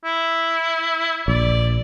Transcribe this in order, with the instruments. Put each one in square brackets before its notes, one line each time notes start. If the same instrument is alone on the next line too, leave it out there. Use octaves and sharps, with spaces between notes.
[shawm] E4
[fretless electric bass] A#1 [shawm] D5